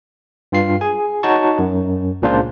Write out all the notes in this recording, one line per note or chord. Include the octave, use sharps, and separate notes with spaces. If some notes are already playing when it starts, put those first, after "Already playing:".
G2 F4 C7
G#4 G#5
D#4 F#4 C#5 A5 C#6
F#2
C#2 A#2 C#3 D4 F4 C5